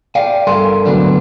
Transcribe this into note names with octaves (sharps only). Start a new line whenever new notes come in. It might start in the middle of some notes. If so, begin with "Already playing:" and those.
D5 F5 G5 G#5
G2 A4 A#4 G#5 C6
D3 F#3 A3 B3 D4